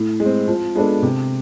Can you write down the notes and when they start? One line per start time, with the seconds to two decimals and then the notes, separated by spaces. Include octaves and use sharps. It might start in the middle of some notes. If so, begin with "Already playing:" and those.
Already playing: A2
0.20 G#3
0.25 C4
0.48 F3
0.75 G#3 B3 D4 A4
1.02 C3